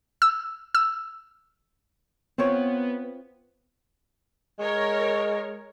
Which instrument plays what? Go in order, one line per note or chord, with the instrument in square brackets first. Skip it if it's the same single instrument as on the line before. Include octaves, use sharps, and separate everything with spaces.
[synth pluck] E6
E6
[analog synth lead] B3 [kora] C4 F4 C#5
[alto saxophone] G#3 [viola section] A#4 C#5